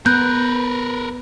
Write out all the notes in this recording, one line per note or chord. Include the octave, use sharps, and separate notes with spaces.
B3 A#4 B4 F#6 G6